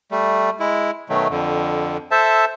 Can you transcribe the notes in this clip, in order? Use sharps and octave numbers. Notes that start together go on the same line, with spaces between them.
G3 A3
G#3 E4
B2 D#3 F#3 A3
F2 D3
A4 C5 E5 A5